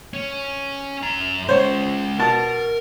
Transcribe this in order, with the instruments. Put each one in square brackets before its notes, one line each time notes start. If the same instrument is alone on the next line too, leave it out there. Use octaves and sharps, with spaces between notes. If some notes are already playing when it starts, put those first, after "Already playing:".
[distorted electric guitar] C#4
F#2 A#5
[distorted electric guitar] G#3 C#4 [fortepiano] C5 C#5
[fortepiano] B2 A5 [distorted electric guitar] A#4